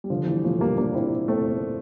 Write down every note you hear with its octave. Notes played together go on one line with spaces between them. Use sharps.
G3
D3 F3
E3 G3
F3 A3
G3 A#3
A#3 D4
C4 E4
A3 C4